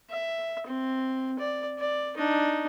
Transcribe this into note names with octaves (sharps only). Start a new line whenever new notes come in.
E5
C4
D5
D5
D4 D#4